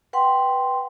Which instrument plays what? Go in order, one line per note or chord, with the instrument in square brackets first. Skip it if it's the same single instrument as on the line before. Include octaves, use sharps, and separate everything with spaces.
[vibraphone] B4 F#5 G5 C6